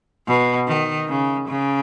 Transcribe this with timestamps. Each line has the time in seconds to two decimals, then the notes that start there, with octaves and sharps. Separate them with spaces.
0.27 B2
0.67 D#3
1.08 C#3
1.48 C#3